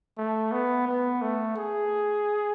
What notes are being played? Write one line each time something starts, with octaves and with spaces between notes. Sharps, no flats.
A3
B3
B3
A3
G#4